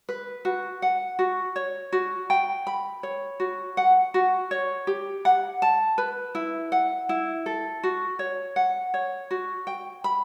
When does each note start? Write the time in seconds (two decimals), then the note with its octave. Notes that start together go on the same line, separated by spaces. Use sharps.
0.09 B4
0.45 F#4
0.82 F#5
1.19 F#4
1.56 C#5
1.92 F#4
2.30 G5
2.67 B5
3.03 C#5
3.40 F#4
3.77 F#5
4.14 F#4
4.51 C#5
4.87 G4
5.25 F#5
5.62 A5
5.98 B4
6.35 E4
6.72 F#5
7.09 E4
7.46 A4
7.83 F#4
8.19 C#5
8.56 F#5
8.94 C#5
9.31 F#4
9.67 G5
10.04 B5